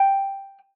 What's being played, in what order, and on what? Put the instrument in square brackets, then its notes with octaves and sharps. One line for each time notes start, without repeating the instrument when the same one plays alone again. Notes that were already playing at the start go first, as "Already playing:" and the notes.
Already playing: [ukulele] G5